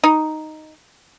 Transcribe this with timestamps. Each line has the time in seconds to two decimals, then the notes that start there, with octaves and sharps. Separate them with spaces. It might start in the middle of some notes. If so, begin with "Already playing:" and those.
0.04 D#4